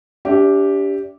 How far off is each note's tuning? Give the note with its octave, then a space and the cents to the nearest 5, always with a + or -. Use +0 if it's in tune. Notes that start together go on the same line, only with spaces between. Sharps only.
D4 -35 G4 +0 E5 +0